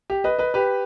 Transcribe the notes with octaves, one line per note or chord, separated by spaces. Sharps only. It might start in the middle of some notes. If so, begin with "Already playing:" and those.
G4
B4 D#5
B4 D#5
G4 B4